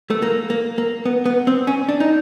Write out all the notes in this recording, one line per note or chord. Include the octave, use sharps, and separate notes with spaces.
A3
A#3
A#3
A#3
B3
B3
C4
C#4
D4
D#4